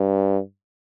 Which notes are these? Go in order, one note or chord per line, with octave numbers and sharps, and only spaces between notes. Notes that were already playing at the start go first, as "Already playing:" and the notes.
Already playing: G2